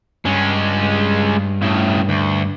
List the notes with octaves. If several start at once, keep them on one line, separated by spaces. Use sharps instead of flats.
G2 G#3 C#4
A2 C#3
D2